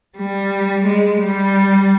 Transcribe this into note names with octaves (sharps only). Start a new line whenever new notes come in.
G3
G#3
G3